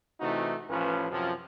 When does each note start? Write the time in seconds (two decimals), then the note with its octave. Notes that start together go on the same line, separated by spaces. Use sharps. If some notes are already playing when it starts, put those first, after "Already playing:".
0.20 C3 E3 A3 D#4 F#4
0.69 A1 F3 C#4 B4
1.11 F#2 C3 F3